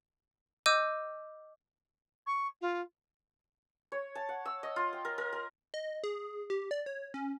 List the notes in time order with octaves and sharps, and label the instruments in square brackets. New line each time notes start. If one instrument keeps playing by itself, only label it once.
[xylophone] D#5 D6 E6 G6 D#7
[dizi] C#6
F4
[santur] C#5
A5
F#5
E6
D#5
F4
G5
A#4
A#4
A#4
[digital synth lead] D#5
G#4
G4
D5
C#5
C#4